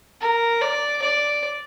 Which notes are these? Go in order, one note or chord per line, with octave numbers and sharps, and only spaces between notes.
A#4
D5
D5